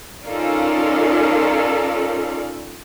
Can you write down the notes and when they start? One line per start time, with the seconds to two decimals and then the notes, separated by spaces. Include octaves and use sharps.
0.24 C#4 D#4 F4 A4 A#4 D5